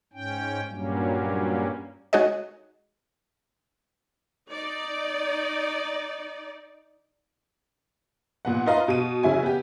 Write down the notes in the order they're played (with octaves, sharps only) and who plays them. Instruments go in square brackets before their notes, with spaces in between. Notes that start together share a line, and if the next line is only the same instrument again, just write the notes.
[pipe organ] G#2 C#4 G5
G2 A#2 F#3 G3 A#3 C#4
[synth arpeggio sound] G#3 D#4 F#4 G#4 C#5 D#5
[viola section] D#4 D5
[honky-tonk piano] A#2 B3 F#5
D#4 F4 B4 D#5 F5 A#5
B2 D#7
C#3 F#3 E4 G#5
B3 G4